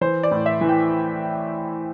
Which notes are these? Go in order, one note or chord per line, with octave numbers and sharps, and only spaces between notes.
E3 C5
D5
A2
E5
E3
G5